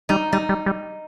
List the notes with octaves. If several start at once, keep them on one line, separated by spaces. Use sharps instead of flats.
G3 D#4
G3 D#4
G3
G3